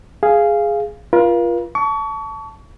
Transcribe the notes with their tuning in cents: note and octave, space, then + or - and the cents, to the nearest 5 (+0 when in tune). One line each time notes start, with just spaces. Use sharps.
G#4 +0 F5 -10
F4 -15 A#4 +45
A5 +0 C#6 +35